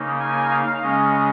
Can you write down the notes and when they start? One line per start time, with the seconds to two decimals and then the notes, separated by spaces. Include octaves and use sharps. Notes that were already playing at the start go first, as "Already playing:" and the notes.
Already playing: C#3 A#3 D#4
0.20 G#5
0.50 F5
0.82 C#3 G#3 C#4 D#5